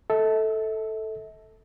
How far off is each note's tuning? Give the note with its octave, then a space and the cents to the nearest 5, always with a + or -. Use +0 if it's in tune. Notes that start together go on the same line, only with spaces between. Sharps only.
A4 +0 E5 -40